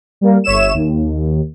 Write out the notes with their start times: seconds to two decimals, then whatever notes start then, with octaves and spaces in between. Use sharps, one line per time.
0.21 G3 A#3
0.44 G1 C#5 E5 E7
0.74 D#2